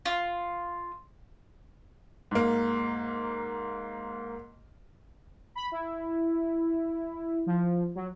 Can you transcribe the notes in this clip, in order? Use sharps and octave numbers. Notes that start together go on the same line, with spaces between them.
F4
G#2 A#3
B5
E4
F3
F#3